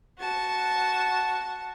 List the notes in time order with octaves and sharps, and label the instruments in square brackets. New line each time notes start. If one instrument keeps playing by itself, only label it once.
[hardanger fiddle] F#4 A5